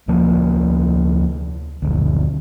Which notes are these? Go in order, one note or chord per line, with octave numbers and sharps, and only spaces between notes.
D2 F3 A#3
F#1 D2